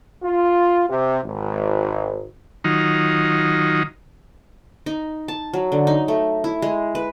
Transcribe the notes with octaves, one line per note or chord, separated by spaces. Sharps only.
F4
C3
G#1
D#3 F#3 D#4 F4
D#4
A5
F#3
D3
D#4
A3
E4
G#3
B4